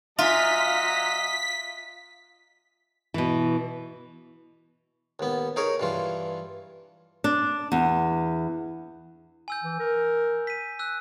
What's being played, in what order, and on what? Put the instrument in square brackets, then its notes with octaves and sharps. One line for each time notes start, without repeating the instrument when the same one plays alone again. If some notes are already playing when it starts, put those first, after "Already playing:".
[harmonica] F#3 D#5 A#5 [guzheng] F4 [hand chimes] E5 G#5 [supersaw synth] B6
[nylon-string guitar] B2 E3
[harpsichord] D#2 B3
D#4 G#4 A#4 C#5
G2 E3 F4
[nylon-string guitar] D4
E2
[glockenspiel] G#5 E6 G6
[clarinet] E3
A#4
[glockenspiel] B6 D#7
E6 F#6